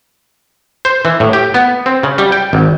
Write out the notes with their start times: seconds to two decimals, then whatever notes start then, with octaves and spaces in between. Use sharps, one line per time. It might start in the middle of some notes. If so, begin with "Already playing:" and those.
0.85 C5
1.05 E3
1.20 A2
1.33 G4
1.54 B3
1.86 C4
2.03 C#3
2.18 G3
2.32 G5
2.53 G#1